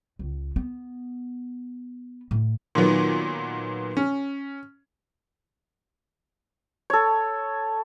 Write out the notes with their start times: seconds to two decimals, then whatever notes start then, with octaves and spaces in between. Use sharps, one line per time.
0.19 C#2
0.56 B3
2.31 A2
2.75 A#2 D#3 F#3 B3
3.97 C#4
6.90 A4 C#5